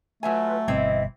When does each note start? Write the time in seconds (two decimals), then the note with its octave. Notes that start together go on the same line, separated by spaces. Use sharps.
0.23 F#3 A3 F4 B4 E5 G#5
0.68 G1 B2 E3 G3 C4 E4 D#5 E5